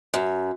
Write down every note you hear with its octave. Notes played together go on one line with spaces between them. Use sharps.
F#2